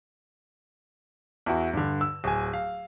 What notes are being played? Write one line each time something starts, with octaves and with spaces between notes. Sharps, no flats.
E2 E4 F#4
G2 D3
E6
D1 G#5
F5